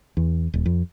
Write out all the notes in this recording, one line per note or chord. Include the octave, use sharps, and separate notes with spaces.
E2
D#1
F2